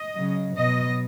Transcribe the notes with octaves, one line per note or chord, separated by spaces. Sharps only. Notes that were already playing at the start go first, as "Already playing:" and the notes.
Already playing: D#5
C#3 F#3
B2 F#3 D#5